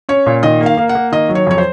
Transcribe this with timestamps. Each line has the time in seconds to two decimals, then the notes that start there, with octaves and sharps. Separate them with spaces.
0.09 C#4 C#5
0.26 A#2
0.43 D#3 D#5
0.61 A#3
0.66 F5
0.77 A#3
0.89 F#5
0.95 A#3
1.12 D#3 D#5
1.29 F#3
1.35 C#5
1.47 F2 C#5
1.58 C5